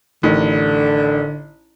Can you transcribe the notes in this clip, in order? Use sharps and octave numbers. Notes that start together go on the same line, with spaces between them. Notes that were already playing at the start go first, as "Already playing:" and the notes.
A1 D3 D#3